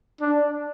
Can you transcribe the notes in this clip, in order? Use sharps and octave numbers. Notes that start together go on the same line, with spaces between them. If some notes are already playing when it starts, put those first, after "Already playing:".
D4